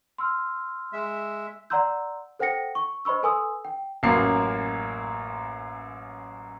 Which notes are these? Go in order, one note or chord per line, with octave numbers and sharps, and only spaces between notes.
C6 E6 F6
G#3 E5
D5 F#5 A#5 C6 E6 G6
A4 C5 F#5 G5 A#6 C#7
C#6
C5 D#5 B5 C#6 E6
A4 B4 G#5 C6 D#6 E6
G5
A1 F#2 A#3 C7